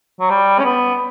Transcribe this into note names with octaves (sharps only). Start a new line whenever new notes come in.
F#3
G3
C#4
B3